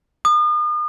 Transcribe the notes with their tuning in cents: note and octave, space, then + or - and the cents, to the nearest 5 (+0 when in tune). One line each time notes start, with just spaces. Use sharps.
D#6 -40